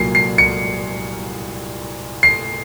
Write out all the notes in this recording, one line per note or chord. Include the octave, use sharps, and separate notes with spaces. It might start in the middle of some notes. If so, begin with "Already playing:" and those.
Already playing: C2 A#2 F#3 C7
C7
C#7
C7